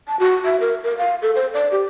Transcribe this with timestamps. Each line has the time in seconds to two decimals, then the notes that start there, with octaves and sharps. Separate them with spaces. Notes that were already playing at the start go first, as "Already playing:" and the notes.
0.08 A5
0.20 F#4
0.45 E5
0.60 A#4
0.83 A#4
0.98 F5
1.22 A4
1.35 C5
1.54 D5
1.72 G4